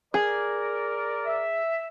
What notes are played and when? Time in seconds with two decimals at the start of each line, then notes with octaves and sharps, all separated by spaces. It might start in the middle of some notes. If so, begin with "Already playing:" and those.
0.14 G#4 A#4 D5
1.25 E5